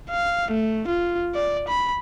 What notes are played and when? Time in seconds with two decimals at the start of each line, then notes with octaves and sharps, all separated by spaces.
0.11 F5
0.51 A3
0.88 F4
1.35 D5
1.68 B5